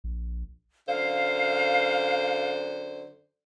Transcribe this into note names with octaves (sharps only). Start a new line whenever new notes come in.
A#1
F#2 D3 C5 F5